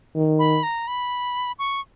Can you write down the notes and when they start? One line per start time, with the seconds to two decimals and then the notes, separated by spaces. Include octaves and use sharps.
0.15 D#3
0.39 B5
0.63 A#5
0.87 B5
1.59 C#6